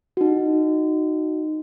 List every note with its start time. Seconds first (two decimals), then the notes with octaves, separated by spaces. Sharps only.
0.17 D#4 F#4